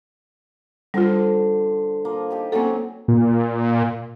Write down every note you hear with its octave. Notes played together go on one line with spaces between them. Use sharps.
D3 G3 F4 C5
F3 A#3
D#4 G4 A4
F#3 A#3 C4 C#4 A4
A#2